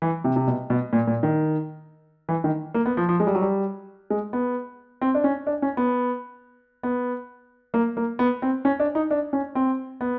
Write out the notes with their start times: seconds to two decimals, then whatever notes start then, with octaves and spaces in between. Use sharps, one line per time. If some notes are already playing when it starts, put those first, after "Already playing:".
0.02 E3
0.24 C3
0.36 C3
0.47 B2
0.70 B2
0.93 A#2
1.07 A#2
1.23 D#3
2.29 E3
2.44 D#3
2.74 A#3
2.86 B3
2.97 F3
3.09 F3
3.20 G#3
3.27 G3
3.35 F#3
3.42 G3
4.10 G#3
4.33 B3
5.01 C4
5.15 D4
5.24 C#4
5.47 D4
5.62 C#4
5.77 B3
6.83 B3
7.74 A#3
7.97 A#3
8.19 B3
8.42 C4
8.65 C#4
8.80 D4
8.95 D#4
9.11 D4
9.33 C#4
9.55 C4
10.01 B3